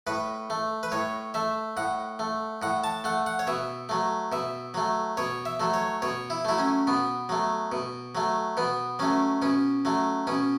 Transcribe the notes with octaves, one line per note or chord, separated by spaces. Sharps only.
A2 B4
A3
B4
A2 C#5
A3 E5
A2 F#5
A3
A2 F#5
A5
A3 F#5
F#5
C#5
B2 E5
F#3 A3
B2 E5
F#3 A3
B2 C#5
E5
F#3 A3
C#5
B2 C#5
E4
F#3 A3 E4
C#4
B2 B3
F#3 A3
B2
F#3 A3
B2 B3
F#3 A3 C#4
B2 C#4
F#3 A3
B2 C#4